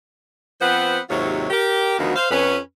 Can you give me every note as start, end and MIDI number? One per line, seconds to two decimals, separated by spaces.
0.62 0.99 53
0.62 0.99 59
0.62 0.99 60
0.62 0.99 71
0.62 0.99 72
0.62 0.99 78
1.10 1.48 39
1.10 1.48 44
1.10 1.48 48
1.10 1.48 54
1.10 1.48 65
1.10 1.48 73
1.50 1.96 67
1.50 1.96 70
1.99 2.15 38
1.99 2.15 51
1.99 2.15 53
1.99 2.15 59
1.99 2.15 66
2.16 2.27 72
2.16 2.27 77
2.31 2.58 41
2.31 2.58 61
2.31 2.58 71